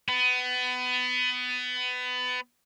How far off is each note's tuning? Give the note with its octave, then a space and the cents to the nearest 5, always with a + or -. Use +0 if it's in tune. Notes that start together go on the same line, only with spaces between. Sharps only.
B3 +25